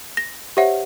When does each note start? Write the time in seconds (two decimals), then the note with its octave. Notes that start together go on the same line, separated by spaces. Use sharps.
0.17 A#6
0.57 G4 C5 C#5 E5 F#5